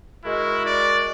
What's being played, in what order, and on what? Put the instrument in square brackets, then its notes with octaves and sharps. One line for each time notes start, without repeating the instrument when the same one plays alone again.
[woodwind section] G#3 F#4 A#4 [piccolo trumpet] E4
[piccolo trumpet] D5